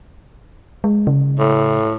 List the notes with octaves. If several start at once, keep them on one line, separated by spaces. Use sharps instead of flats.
G#3
C#3
A2